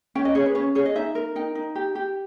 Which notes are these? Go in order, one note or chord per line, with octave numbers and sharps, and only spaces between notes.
C#4 G5
D#5
G#4 C#5
B4
C#4 C#5
G#4 C#5
D#5
D#4 E5
A#4
D#4 G5
D#4
G4
G4